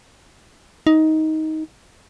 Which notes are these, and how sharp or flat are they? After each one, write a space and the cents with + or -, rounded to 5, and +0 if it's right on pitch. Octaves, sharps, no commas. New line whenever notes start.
D#4 +15